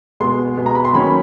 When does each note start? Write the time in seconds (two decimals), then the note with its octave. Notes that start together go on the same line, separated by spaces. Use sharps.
0.20 B2 G#3 B3 C6
0.57 B2 G#3 B3
0.66 A#5
0.75 B5
0.85 C6
0.93 D#3 F#3 A#3 C#4 B5
1.07 B5